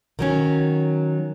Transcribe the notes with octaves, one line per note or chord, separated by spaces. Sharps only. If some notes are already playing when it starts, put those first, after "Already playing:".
D#3 F#3 C#4